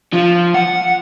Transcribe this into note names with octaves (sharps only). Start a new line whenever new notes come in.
F3
F#5